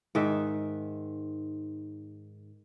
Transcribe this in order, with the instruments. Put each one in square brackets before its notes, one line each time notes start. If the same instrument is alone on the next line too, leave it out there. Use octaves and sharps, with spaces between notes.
[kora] G#2 D#3 E5